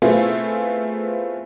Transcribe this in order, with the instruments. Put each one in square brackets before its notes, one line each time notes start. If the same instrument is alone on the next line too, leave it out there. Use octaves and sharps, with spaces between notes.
[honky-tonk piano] A3 B3 C4 E4 F4 G#4